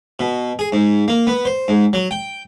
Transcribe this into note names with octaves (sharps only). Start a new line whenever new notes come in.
B2
G#4
G#2
A#3
B3
C5
G#2
F#3
G5